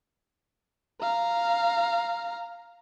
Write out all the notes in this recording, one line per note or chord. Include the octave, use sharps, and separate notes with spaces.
F5 A#5